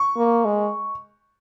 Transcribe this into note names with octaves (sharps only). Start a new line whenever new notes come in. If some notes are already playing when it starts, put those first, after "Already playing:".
Already playing: C#6
A#3
G#3